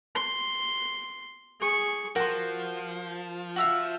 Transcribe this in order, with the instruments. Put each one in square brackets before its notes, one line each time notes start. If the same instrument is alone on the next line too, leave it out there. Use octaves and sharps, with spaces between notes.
[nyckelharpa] C6
G#4 C#6
[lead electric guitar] F3 [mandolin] F#4 C6 [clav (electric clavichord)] A#4
[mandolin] F#4 E5 F5